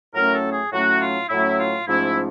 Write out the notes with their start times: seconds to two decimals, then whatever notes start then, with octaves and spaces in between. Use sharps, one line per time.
0.14 A2 F#3 A3 C#4 A#4
0.33 A4
0.52 G#4
0.72 A2 F#3 A3 C#4 F#4
1.01 F4
1.30 A2 F#3 A3 C#4 E4
1.59 F4
1.88 G#2 F3 A3 C#4 E4